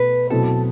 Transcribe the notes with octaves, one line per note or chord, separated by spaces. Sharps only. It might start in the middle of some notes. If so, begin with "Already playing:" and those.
Already playing: B2 A3 B4
B2 F#3 A3 C4 E4 A4